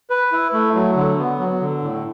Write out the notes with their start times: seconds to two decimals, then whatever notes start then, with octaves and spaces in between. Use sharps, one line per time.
0.10 B4
0.32 E4
0.53 A3
0.75 F#3
0.96 D3
1.18 B3
1.39 F#3
1.61 D3
1.82 A2